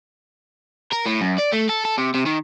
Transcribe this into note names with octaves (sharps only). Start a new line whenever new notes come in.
A#4
A2
F#2
D5
A3
A4
A4
C3
C3
D#3